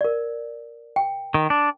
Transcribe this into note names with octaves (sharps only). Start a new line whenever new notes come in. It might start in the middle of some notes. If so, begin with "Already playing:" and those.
A#4 D5
G5
D#3
D4